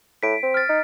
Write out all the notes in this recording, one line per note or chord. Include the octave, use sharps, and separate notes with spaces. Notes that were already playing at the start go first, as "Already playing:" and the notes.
A2 B6 D7
C4
F6 A6
D#4